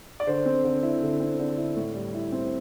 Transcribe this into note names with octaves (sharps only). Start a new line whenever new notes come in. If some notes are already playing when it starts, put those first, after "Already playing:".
D5
D3 C5
C4
D3
E4
D3
C4
D3
E4
A2
G3
E4
C4